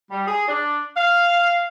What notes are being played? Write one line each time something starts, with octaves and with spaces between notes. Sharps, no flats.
G3
G#4
D4
F5